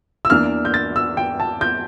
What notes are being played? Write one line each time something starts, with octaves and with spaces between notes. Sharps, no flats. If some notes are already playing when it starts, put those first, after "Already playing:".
E6
E2 E3 A#3 D4 F6
G6
A6
E6
G5
A5
G6